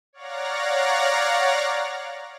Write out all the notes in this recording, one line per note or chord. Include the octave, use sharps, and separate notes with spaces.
C#5 D5 F5 F#5 A#5 A#6